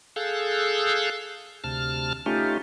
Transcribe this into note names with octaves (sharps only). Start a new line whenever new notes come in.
G#4 A4 F5 E6 F#6 G6
D2 C3 A5 F6
A3 C#4 D#4 F4 G4